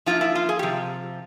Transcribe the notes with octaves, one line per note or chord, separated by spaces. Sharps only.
F3 A#3 E4 F4
E4
F4
G#4
C3 F3 G4